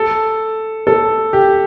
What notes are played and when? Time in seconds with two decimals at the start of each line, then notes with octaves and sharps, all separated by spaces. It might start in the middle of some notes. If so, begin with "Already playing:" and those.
Already playing: A4
0.87 A4
1.33 G4